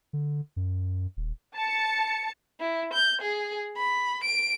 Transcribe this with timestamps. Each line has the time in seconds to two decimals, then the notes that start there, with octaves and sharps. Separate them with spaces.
0.13 D3
0.56 F#2
1.17 D#1
1.55 A5 C#7
2.60 E4
2.93 G6
3.22 G#4
3.77 B5
4.24 D7